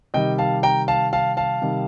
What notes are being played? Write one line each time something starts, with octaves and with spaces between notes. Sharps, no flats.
C3 D#3 G3 D#5 G5
F5 A5
G5 A#5
F5 A5
F5 A5
F5 A5
C3 D#3 G3